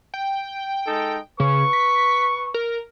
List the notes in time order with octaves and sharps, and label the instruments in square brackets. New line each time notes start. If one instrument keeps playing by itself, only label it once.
[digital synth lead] G5
[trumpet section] G#3 D#4 A4
[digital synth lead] C#3 [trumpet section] B4 C#6
[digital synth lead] B6
A#4